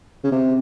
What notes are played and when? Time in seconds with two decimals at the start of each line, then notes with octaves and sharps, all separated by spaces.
0.24 C#3
0.32 C3